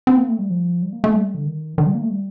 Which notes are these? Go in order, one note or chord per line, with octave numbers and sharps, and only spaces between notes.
C4
A#3
A3
G3
F3
G3
A#3
A3
G3
D3
D#3
D#3
G3
A#3
A3
G3